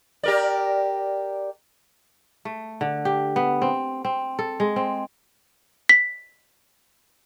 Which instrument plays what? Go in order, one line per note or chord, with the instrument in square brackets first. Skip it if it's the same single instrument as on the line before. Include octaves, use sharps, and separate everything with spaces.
[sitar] G4 A#4 D5
[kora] A3
D3
G4
B3
C4
C4
A4
G#3
C4
[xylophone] B6